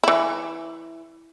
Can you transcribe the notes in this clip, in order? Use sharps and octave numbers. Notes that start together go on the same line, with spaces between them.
E3 E4